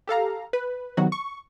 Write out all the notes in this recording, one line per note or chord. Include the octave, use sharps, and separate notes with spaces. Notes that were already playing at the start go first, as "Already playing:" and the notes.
G4 A4 F5 A#5
B4
C3 D#3 F#3 B3 F#4
C#6